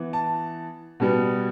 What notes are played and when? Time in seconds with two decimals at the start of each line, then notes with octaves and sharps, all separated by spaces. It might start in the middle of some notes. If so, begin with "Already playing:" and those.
Already playing: E3 B3
0.13 A5
1.00 B2 G3 B3